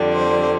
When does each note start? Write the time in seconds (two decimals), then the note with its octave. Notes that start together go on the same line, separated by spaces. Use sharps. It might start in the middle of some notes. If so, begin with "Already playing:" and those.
Already playing: F2 D3 G3
0.14 C5